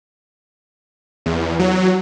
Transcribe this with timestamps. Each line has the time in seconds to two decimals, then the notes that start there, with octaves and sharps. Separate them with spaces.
1.26 E2
1.59 F#3